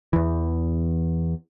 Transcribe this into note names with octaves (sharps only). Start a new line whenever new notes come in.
E2 E3